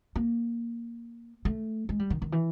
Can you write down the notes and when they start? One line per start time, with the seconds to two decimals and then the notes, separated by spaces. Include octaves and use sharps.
0.16 A#3
1.45 A3
1.89 G#3
1.99 G3
2.10 D#3
2.22 D#3
2.32 E3